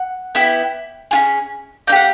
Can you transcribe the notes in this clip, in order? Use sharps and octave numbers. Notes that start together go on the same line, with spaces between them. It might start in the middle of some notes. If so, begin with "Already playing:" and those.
Already playing: F#5
B3 E4 G4
C#4 F4 G#4
A#3 D#4 G4 F#5 G5